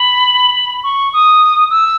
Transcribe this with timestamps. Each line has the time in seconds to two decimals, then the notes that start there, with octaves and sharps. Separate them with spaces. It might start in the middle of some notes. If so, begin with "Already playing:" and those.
Already playing: B5
0.84 C#6
1.13 D#6
1.70 E6